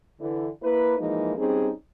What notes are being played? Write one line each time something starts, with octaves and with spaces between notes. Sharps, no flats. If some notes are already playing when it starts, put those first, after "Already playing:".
D3 E3
A#3 E4 B4
E3 F3 G#3 A#3 D#4
G3 C4 C#4 D#4 G#4